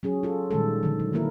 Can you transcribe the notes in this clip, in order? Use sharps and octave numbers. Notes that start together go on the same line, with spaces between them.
F#3 C#4 G#4
F4 A4
A#2 D#3 G3 G#3 A4
D3 D#3 F3
F#3
D#3 A#3 E4 A#4